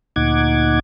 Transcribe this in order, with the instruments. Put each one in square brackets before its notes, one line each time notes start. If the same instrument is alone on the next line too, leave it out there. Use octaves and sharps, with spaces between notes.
[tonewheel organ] D2 A#2 D#4 F#5 D6 G#6